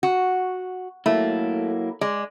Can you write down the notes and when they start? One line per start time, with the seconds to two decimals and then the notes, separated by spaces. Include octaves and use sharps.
0.03 F#4
1.06 F#3 A3 A#3 E4
2.01 G#3 D5